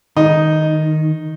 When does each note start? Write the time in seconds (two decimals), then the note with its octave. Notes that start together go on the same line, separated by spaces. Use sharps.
0.17 D#3 D#4